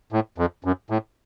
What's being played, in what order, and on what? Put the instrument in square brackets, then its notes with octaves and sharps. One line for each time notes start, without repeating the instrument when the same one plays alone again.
[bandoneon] A2
F2
F#2
A2